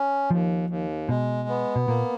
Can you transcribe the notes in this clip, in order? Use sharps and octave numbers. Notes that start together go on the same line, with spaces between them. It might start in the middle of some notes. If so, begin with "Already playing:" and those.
Already playing: C#4
D#2 F3
D#2
B2 G#3
B3
B2
A#2 A#3